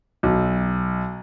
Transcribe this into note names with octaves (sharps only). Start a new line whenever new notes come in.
B1